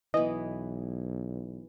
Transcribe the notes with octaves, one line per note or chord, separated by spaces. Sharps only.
B1 E3 B3 D#5